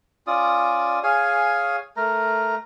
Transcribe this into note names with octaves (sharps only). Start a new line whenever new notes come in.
C#4 F4 D5 D#6
G#4 C#5 F5 G#5
A3 A#4 A#5